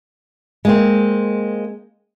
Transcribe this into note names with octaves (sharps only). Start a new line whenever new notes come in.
G#3 A#3 C4